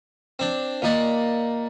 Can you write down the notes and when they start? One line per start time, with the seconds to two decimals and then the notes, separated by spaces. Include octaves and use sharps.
0.39 C4 D4
0.82 A#2 D#4 D5